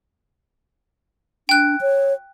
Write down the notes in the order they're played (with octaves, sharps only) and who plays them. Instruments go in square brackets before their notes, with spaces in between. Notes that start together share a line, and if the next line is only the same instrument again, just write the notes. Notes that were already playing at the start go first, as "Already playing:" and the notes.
[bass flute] D4 [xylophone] G5 F#6
[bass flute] C#5